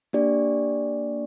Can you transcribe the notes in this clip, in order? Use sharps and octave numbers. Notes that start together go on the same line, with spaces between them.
A#3 D4 G4 D5